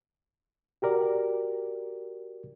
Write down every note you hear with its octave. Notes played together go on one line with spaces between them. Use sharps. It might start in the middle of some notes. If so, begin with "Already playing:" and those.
F#4 G4 A#4 D5